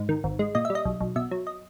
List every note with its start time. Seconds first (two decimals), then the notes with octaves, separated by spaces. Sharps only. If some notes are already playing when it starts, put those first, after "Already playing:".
Already playing: G#2
0.09 D#3
0.24 G#1
0.39 G#3
0.55 A#2 D#5
0.65 E5
0.70 G3
0.75 D#5
0.85 B1
1.01 B1
1.16 B2 E5
1.31 F#3
1.47 D#5